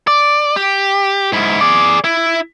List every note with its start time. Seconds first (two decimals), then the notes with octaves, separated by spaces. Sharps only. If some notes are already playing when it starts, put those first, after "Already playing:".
0.07 D5
0.56 G4
1.33 G#2 E4
1.61 G#4 D5
2.04 E4